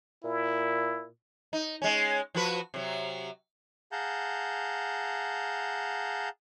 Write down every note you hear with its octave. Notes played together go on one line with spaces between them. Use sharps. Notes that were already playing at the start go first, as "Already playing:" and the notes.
A#2 E4
D#4
G#3 C#4
F3 F#4 B4
C3 F#3
G#4 F5 F#5 A5 A#5 G6